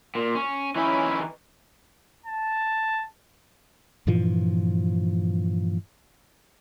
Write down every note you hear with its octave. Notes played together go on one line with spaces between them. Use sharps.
A#2
C#4
E3 C#4 D#4 E4 B5
A5
G2 A#2 E3 F3